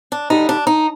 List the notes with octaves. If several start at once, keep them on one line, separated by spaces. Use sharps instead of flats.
D4
D#2 D3 G3 D#4
D4
D#4